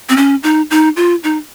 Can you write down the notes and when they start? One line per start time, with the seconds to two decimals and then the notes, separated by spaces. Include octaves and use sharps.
0.09 C4
0.17 C#4
0.43 D#4
0.70 D#4
0.96 F4
1.24 D#4